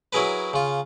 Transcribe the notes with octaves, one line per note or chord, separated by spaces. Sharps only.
F#3 E4 G#4 A#4 B4
C#3 F4